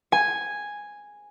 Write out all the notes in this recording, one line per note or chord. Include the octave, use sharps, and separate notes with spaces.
G#5